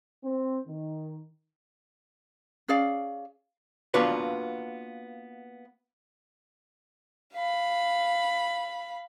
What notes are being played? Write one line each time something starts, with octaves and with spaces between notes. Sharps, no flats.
C4
D#3
C#4 G#4 D5 F5
A#3 B3 D4 F4 F#4 B4
F5 B5